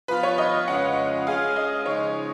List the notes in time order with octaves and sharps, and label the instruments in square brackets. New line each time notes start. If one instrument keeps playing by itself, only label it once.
[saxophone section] F3 B3 F4 [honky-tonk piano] B4
[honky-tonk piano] C#5
D#5
[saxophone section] F2 C#3 G#3 C#4 F4 [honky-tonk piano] F#5
[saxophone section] G#3 C#4 F4 G#4 [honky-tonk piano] F5
[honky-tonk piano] D#5
[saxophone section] C#3 F3 G#3 D#4 G#4 [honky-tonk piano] C#5